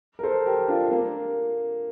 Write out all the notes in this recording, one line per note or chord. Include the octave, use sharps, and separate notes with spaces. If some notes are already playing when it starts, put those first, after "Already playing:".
A#4
A4 C5
G4 A#4
D4 F4
A#3